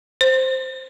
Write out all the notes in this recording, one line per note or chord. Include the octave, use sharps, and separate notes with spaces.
C5